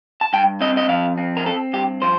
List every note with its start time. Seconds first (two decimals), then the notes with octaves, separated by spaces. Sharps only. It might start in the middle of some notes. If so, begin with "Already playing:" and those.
0.21 A5
0.33 G2 G5
0.61 C4 D#5
0.77 D#5
0.89 F3 F5
1.18 C4
1.37 A#4
1.46 C4 A4
1.73 G2 G4
2.02 F3 C5